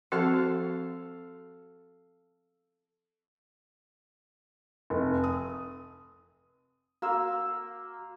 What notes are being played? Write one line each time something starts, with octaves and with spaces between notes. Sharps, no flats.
F3 C4 F#4 A4 F5
F1
D#6
A#3 F#4 C6 E6